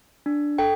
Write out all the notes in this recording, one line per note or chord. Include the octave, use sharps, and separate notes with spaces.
D4
A4 G5